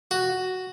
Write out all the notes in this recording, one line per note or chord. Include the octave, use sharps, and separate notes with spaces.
F#4